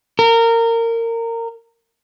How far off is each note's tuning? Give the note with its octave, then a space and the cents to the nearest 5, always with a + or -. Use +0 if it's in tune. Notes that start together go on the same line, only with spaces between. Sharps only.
A#4 -20